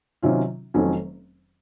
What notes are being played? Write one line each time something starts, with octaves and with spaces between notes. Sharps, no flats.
C3 D#3 F#3 C#4 F4
F1 F2 D#3 F#3 C#4